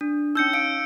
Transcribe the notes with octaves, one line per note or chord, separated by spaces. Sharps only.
D4
C#4 D#4 E6 G6 C#7
F5 C#7 D7